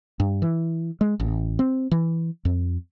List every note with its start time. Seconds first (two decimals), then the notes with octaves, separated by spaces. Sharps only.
0.20 G2
0.42 E3
1.01 G#3
1.20 A1
1.59 C4
1.91 E3
2.45 F2